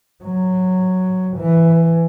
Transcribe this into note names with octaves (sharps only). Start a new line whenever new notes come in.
F#3
E3